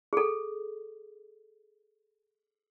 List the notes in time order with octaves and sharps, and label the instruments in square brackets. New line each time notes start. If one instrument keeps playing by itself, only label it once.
[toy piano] G#4 A4